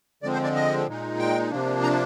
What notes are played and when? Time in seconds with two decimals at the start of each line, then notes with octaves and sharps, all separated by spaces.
0.23 D3 F3 G#3 C4 D5
0.33 C5
0.44 D5
0.55 D#5
0.87 A#2 G#3 D#4
1.19 G5
1.51 C3 F3 A#3 D4
1.83 A#5